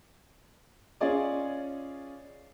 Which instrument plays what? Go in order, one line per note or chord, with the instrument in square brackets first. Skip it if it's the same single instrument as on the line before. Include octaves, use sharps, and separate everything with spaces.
[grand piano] C#4 F4 G#4 D5 D#5